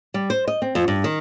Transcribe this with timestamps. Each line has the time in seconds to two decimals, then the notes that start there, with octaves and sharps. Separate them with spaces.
0.14 G3
0.30 C5
0.48 D#5
0.62 C4
0.75 F2
0.88 G2
1.04 D#3